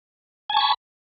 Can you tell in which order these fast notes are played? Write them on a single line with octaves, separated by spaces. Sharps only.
G#5 A5 C#6 B5